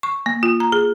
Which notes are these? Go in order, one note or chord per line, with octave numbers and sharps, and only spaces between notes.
C#6
A#3
F4
A#5
G#4